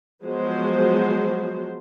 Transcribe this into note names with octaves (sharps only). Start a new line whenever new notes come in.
F3 F#3 G#3 B3 F#4 C5